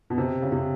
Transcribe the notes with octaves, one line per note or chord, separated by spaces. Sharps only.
B2
C3
C#3
C3